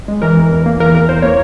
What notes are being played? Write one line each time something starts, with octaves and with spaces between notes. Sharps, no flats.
G#3
E3 A#4
E2
E2
A#3
E3 A#4
E2 A#4
E2 C5
A#3 C#5